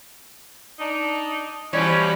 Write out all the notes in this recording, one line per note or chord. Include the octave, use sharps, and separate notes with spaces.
D4 D#4
B2 E3 F3 G3 C#4 E4